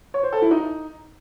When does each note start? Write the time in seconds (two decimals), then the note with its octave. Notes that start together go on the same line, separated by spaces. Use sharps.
0.14 C#5
0.23 C5
0.32 A4
0.42 E4
0.51 D#4